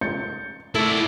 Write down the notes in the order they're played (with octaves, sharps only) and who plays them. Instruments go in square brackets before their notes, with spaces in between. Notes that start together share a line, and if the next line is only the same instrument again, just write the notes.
[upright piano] G6 A6 C#7
[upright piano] A3 [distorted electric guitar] E4 D5 [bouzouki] A4